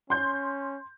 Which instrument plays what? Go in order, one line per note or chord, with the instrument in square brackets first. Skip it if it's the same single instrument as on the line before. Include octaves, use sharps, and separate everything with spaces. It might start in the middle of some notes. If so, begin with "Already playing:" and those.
[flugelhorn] C#4 [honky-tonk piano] C6 G6